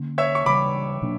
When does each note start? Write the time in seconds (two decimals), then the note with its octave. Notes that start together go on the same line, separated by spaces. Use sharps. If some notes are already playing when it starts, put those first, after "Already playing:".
Already playing: D3 A#3 C#4
0.18 C#5 E5
0.35 C#6
0.46 C#3 E3 G3 B5 D6
1.02 B2 F#3 A#3 D4